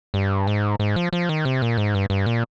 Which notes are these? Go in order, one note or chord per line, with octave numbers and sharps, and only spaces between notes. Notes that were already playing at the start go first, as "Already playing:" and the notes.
G2
G#2
G#2
F3
F3
D#3
C3
A#2
G#2
G2
G2
A#2